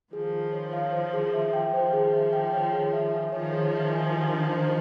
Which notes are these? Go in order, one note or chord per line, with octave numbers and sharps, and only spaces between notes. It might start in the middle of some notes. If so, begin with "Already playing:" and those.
D#3 F3 G#4
F4
C#5
F5
C5
G#4
E5
G5
D#3 F3 C5
G#4
E5
G5
C#5
G#4
E5
G#5
D#3 F3 C#5
G#4
E5
G#5
G4
D4
C5